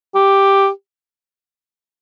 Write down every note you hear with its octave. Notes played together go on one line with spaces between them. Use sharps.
G4